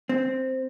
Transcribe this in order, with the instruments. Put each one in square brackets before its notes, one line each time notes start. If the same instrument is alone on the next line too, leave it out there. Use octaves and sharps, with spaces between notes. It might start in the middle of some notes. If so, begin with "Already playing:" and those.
[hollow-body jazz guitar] C4